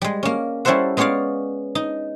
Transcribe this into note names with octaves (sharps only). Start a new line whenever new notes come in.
G3 G#3
A#3 C#4
G3 C#4 E4 A4 C5 F#5
G#3 B3 C#4 C#5 D5 F5
D#4